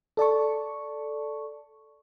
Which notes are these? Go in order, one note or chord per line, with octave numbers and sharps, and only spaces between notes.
A4 D5 A5 C#6